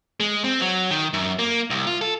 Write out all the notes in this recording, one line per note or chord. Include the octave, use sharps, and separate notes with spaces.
G#3
C4
F#3
D#3
F#2
A#3
C2
F4
A4